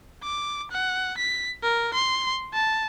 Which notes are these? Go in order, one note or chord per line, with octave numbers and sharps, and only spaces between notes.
D6
F#5
B6
A#4
C6
A5